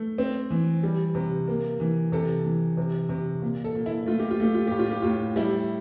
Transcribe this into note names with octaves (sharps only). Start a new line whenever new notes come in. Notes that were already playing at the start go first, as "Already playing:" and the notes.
Already playing: A3
C4
E3
G3
C3
A#3
E3
C3 A4
E3
C3
C3
A#2
A4
A#2
E4
A3 F4
G4
F4
A3 G4
F4
A2 G4
F4
G4
A2 F4
G3 E4